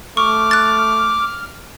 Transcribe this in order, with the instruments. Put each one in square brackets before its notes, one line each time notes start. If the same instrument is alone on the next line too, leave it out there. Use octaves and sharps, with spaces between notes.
[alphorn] A3 [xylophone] C#6 [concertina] D6 [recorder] F6
[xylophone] F#6 A6